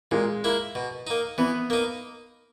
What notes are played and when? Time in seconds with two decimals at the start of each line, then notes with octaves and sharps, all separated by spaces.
0.11 A#2 G#3
0.44 A#3 E4
0.75 B2
1.07 A#3 D#4
1.38 E3 B3
1.70 A#3 D#4